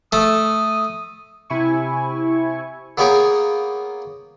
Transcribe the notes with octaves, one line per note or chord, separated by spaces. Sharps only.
A3 D#6
C3 E4 G#5 C#6
A#3 B3 C#4 G#4 G5 A#5